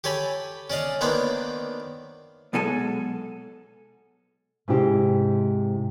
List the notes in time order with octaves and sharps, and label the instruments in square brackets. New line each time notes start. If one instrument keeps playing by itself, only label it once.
[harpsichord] G4 A4 C#5 G#5 B5
C#4 D5 D#5 F5
D#3 A#3 B3 D4 C5 C#5
[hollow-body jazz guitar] B1 B2 G#3 A4 G#5 A5
[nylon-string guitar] G#2 C3 E4 G4 C5 D#5